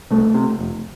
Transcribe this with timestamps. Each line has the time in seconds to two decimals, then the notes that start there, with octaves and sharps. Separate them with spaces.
0.11 C2 A3
0.34 C3
0.59 F1